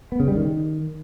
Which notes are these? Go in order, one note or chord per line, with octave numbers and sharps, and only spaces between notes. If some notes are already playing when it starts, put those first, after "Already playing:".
B3
C#3
G3
D#3